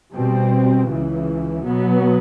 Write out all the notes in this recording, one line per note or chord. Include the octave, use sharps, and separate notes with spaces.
B2 G3 C4
C#2 C#3 E3
B2 F#3 B3